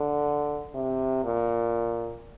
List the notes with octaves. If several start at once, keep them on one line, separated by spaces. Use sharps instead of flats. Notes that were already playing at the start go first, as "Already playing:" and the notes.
Already playing: D3
C3
A#2